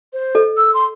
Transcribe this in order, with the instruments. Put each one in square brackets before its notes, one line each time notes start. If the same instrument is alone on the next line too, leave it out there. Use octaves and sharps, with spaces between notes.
[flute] C5
[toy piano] A4 D#5
[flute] E6
C6